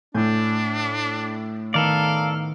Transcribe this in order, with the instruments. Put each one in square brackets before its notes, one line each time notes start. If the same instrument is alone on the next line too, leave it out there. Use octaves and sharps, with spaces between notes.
[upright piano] A2 [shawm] D4 [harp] G#5 G6 G#6
[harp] D#3 B3 [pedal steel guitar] A4 A#4 D5 [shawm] F5